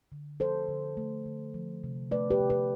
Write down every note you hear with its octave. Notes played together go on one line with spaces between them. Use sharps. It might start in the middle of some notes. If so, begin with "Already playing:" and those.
D3
F3 A4 C5
D3
A3
D3
F3
C3
A3 B4 D5
G4 B4
C3
G4 B4